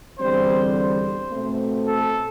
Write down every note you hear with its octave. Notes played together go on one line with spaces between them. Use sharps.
E2 D3 G3 C4 C5
C5
B2 A3 C4
A4